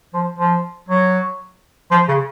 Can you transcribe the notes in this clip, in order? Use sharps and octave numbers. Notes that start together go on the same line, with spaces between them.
F3
F3
F#3
F3
C#3